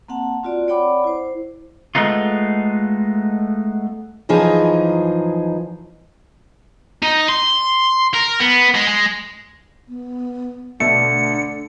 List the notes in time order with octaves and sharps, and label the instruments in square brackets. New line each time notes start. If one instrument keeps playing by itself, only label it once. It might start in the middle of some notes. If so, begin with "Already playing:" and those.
[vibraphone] A#3 C4 F#5 A5
C4 F4 F#4 D5
C#5 D5 F#5 G5 B5 D6
E4 C5
[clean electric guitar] G#3 A3 B3 D#4 F4
[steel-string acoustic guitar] F#2 E3 F3 D#4 G#4
[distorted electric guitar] D#4
C6
A#4
B3
G#3
G#3
[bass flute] B3
[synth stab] B2 A3 [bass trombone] D3 [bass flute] D4 [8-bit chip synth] C#7